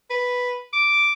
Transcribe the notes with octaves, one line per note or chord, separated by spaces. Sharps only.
B4
D6